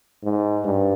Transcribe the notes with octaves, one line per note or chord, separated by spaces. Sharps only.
G#2
G2